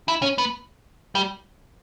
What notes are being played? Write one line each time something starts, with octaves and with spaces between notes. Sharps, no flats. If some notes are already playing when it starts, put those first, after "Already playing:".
E4
C#4
B3
G3